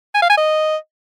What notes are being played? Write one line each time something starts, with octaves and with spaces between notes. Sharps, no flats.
G#5
F5
G#5
D#5